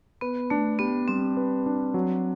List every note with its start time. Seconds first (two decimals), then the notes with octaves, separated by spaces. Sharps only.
0.21 B3 B4
0.50 A3 D4
0.79 B3 G4
1.08 G3 C4
1.37 B4
1.66 D4
1.94 F#3